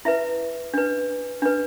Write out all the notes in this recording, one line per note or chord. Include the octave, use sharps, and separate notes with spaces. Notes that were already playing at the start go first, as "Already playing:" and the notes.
E4 B4 E5
D4 B4
D4 B4